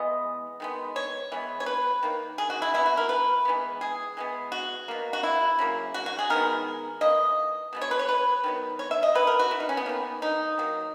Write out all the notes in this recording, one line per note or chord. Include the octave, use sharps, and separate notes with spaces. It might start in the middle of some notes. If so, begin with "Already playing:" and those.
Already playing: E3 G#3 B3 D#5
D#3 G#3 B3
C#5
E3 G#3 B3
C#5
B4
D#3 A#3
G#4
F#4
E4
E3 B3 E4
F#4
A#4
B4
E3 G#3 B3
G#4
E3 G#3 B3
F#4
B2 A#3
F#4
E4
C#3 F#3 A#3
F#4
F#4
G#4
D#3 G#3 B3 A#4
E3 A#3 D#5
B2 G#3 B3
C#5
B4
C#5
B4
D#3 F#3 B3
C#5
E5
D#5
D#3 A#3 B4
A#4
F#4
E4
D#4
C#4
B3
D#3 A#3
D#4
D#3 F#3 A#3